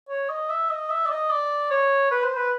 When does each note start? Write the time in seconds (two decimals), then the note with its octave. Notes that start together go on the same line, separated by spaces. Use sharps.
0.09 C#5
0.29 D#5
0.49 E5
0.70 D#5
0.90 E5
1.06 D5
1.10 D#5
1.30 D5
1.71 C#5
2.11 B4
2.24 C5
2.37 B4